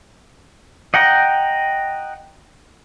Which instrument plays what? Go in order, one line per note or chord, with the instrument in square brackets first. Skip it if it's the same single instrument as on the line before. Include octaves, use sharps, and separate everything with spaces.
[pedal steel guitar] D#5 F#5 G5 A#5